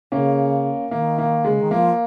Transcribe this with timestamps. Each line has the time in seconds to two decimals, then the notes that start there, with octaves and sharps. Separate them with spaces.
0.12 C#3 A#3 C#4
0.91 D#3 A#3
1.18 A#3
1.45 C#3 G#3
1.60 D#3
1.71 F3 A#3